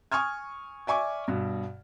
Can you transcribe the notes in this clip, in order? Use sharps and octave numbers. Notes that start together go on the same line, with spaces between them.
G#5 C#6 D#6 F6 G#6
D5 E5 G#5 C#6 D6
G2 B2